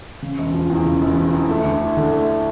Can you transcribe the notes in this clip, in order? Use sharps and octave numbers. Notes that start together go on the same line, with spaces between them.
C#3
E1
F3
E2
C#3
E1
F3
E2
A3
D2
E4
D3
A3